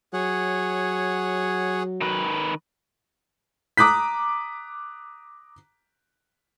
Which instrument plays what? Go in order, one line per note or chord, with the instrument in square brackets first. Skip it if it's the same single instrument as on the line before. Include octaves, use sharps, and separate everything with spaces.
[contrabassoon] F#3 [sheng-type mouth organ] G#4 C#5 F#5
[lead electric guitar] D#3 B4
[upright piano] A#5 D6 D#6 F#6 B6